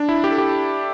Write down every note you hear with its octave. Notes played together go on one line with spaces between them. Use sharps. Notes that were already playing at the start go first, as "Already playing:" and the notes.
Already playing: D4
E4
G4
A4
G4